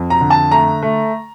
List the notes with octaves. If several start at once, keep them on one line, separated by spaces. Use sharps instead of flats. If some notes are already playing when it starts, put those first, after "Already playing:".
Already playing: F2
A#5
D3
A5
A3 A#5
A3